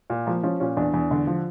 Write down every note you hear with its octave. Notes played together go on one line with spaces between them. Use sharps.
A#2
F3 A#3
F3 C#4
A#2 C#4
E2 D4
E2
D3
F3